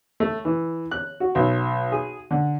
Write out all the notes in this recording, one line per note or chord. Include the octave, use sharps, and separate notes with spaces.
A3
E3
F#6
F#4
B1
G#4
D3